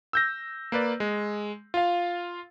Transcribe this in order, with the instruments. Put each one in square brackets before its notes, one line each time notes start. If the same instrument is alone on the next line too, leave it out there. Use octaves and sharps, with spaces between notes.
[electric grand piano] E6 G6 A#6
A#3 B4 D5
G#3
F4 F5